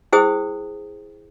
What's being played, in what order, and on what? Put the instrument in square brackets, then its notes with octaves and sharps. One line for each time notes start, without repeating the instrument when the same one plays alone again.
[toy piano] E4 G#4 C5 G5 D#6